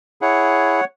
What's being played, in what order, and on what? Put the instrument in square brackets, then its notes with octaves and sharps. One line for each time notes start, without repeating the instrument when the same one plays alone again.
[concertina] E4 G#4 C#5 F#5